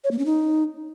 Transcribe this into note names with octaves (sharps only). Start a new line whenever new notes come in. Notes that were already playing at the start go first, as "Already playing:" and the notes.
C#5
A#3
C#4
D#4